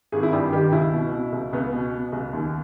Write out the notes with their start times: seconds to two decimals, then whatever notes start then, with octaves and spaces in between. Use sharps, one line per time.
0.12 G#1 G#4
0.23 E4
0.33 G2 G4
0.53 D#3 G4
0.72 C#2 E4
0.93 B2
1.12 B2
1.32 C#2
1.53 C#2 B3
1.72 B2
1.93 B2
2.12 C#2
2.33 D#2